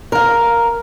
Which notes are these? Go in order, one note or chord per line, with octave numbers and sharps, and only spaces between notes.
A#4 F5